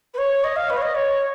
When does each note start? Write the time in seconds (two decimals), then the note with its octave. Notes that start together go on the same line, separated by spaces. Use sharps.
0.14 B4
0.18 C#5
0.44 D#5
0.56 F5
0.69 B4
0.77 C#5
0.82 D#5
0.95 C#5